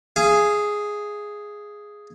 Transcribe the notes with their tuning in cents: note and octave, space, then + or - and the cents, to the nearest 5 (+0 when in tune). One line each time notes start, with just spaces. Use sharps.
G#4 +0 F5 -35